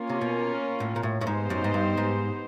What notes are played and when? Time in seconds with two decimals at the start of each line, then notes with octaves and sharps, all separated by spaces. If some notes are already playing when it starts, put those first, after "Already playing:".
Already playing: A#3 C#4 F4 A#4
0.09 C3
0.21 B2
0.80 A2
0.96 A#2
1.03 A2
1.21 A2
1.27 G#2 B3 D#4 G4 C5
1.50 F#2
1.64 G#2
1.74 G2
1.97 G#2